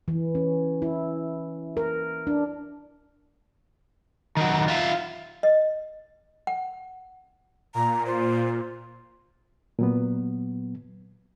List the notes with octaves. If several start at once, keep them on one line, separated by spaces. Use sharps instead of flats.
E3
C#4
E4
A#4
D4
D#3 F#3
F4 E5
D#5
F#5
A#2 A#5
F4 C5
A#2 F#3 B3